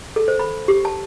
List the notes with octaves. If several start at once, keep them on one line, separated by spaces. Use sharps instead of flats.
A4
C5
B5
G4
A5